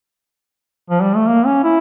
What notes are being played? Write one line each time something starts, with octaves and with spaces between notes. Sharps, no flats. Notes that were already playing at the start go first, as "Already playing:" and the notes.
F3
G3
A3
A#3
C#4
E4